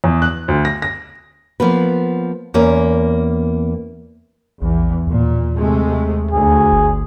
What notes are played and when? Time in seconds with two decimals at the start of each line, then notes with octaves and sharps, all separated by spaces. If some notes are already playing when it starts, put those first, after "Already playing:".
0.04 E2
0.22 F#6
0.48 D2
0.65 A#6
0.82 A#6
1.60 F3 A#3 B3 B4
2.54 E2 A#3 C#4
4.62 A#1 E2
5.07 D#2 A#2
5.56 C3 G#3 A3
6.31 D2 G#4
6.72 G1